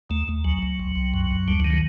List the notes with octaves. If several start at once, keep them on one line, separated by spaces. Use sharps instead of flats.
D#2 A3
D#2
C#2 F#3
C#2
C2
C2
F#2
F#2
D2 G3
F#3
D#3
F#3